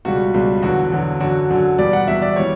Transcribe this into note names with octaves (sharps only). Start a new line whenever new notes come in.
C#2 B2 G3 F#4
C#2 B2 G3
E2 D3 F#3 F#4
E2 D3 F#3
F#2 D3 F#3 F#4
F#2 D3 F#3
E2 B2 G3 D5
F#5
E2 B2 G3 E5
D5
E3 G3 C#5